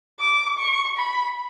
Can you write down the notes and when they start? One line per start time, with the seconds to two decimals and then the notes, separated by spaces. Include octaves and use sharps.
0.20 D6
0.58 C#6
0.97 B5